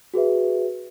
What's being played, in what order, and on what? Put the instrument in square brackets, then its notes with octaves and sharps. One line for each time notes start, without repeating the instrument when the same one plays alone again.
[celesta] F#4 G#4 B4 E5